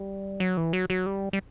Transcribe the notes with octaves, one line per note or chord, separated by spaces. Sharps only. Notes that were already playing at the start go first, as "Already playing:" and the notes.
Already playing: G3
F#3
E3
F#3
F#3
G3
G3